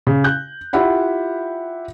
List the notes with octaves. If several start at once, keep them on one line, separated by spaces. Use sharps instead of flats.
C#3
F#6 G6
E4 F4 G4 E5 F#5 B5